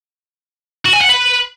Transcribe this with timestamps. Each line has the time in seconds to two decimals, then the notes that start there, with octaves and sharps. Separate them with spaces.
0.86 F#4
0.94 G#5
1.01 F#5
1.09 B4